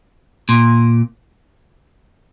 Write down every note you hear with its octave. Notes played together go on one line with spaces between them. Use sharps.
A#2